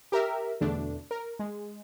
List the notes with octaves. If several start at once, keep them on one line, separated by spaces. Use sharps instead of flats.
G4 A#4 E5
E2 B2 D3 A3 D4
A#4
G#3